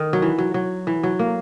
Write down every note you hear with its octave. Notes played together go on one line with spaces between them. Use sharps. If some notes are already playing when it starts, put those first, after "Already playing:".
Already playing: D#3
F#3
E3
F#3
F#3
E3
F#3
A#3